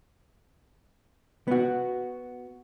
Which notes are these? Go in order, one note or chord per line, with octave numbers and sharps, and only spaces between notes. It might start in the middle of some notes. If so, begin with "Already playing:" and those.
B3 F#4